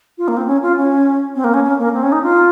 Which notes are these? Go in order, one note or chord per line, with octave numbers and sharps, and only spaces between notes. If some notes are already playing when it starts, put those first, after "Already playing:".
F4
A#3
C4
C#4
F4
C#4
C4
A#3
C#4
C#4
A#3
C4
C#4
D#4
F4